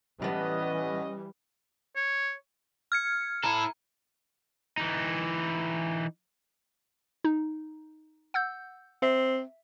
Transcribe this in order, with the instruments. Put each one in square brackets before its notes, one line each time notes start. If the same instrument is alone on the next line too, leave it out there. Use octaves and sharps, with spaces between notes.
[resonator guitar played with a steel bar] A2 B3 [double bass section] E3 G3 [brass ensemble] C#4 D#5
[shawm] C#5
[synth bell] F6 G#6 C#7
[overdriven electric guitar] E4 A4 [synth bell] A#5
[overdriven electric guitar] E3 D#4
[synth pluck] D#4
F#5 E6 G6
[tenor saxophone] C4 [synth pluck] E5